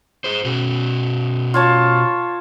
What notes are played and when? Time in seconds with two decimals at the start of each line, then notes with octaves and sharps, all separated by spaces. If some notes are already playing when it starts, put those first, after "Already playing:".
0.24 G#4 C5
0.44 B2 C#4 F#4
1.54 F4 C#5 A5